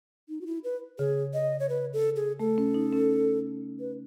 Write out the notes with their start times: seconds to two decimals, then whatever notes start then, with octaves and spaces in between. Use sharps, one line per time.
0.29 D#4
0.41 F#4
0.46 E4
0.64 B4
0.99 C#3 G#4
1.34 D#5
1.60 C#5
1.69 B4
1.93 A4
2.16 G#4
2.40 A3 A4
2.58 C#4
2.74 D#4
2.92 C#4
3.80 B4